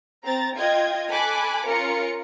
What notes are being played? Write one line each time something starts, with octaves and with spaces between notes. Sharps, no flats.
C4 A#5 A6
F4 D#5 G5 G#6
A4 G#5 B5 D6 F#6
C#4 F4 A#4 C#7